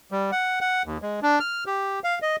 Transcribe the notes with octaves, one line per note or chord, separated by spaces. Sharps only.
G3
F#5
F#5
D#2
G#3
D4
F6
G4
F5
D#5